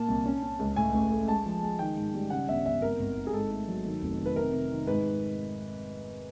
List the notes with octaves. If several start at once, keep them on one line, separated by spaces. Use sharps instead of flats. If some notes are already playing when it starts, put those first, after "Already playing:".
Already playing: A#2 A#3 A5
C2
C#4
C#4
C#2
A2 G#5
A1
A3
G#3 A5
F3
G#3
D#3 G5
G#2
G3
C#3 F#5
G1 E5
G1 E5
G#1 A#4
G#1
G#1
G#4
G#2 A4
A3
F#3
D#3
F1
D#3
B4
C3 A#4
C3
D#3
G#2 B4